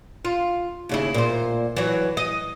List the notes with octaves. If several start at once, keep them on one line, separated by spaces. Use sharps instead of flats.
F4
D#2 C#3 E4
A#2 C5
E3 F#3
D#5